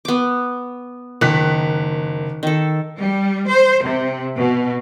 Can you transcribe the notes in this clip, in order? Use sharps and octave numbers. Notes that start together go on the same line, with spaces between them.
B3 D6
F#1 D#3 F#6 B6
D#3 A4
G3
C5
C3
B2